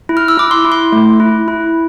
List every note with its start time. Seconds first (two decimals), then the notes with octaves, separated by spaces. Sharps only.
0.09 E4
0.17 F6
0.28 E6
0.37 E4 D6
0.51 C6
0.65 E4
0.72 C6
0.92 A3
1.20 E4
1.48 E4